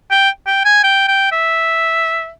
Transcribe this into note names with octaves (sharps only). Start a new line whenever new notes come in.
G5
G5
G#5
G5
G5
E5